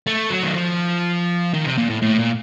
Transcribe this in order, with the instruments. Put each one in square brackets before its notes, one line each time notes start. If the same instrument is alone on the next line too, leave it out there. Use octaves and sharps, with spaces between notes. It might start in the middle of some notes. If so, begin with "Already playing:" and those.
[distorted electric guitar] A3
F#3
D#3
F3
D#3
C3
A#2
A2
A2
A#2